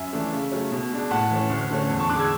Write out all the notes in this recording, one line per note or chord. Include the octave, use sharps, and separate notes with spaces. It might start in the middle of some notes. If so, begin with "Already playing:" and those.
Already playing: F#2 E5 G#5
E3 A3 D4
C#3
F#3 A3 C#4
B2
G#3 D4
A2 F#5 A5
E3 A3 C#4
D2
D3 A3 C#4
E2
A5 C#6
D3 G#3 D6 F#6
E6 G#6